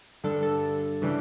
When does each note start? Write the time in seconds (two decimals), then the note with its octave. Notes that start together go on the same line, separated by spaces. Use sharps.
0.24 G2 D3 G3 D4 A4
0.43 A4
1.02 C#3 E3 G3 D4